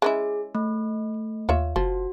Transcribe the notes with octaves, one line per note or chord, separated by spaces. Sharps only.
G#3 C#4 E4 G#4
A3
D#2 F4 C#5 E5
F#1 F3 F#4